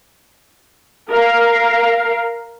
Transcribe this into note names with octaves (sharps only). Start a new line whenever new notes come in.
A#4 F5